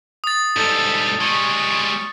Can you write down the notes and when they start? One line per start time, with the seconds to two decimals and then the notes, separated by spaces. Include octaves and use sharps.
0.24 D#6 A6
0.56 G#2 G3 A4
1.21 G3 G#3 C#6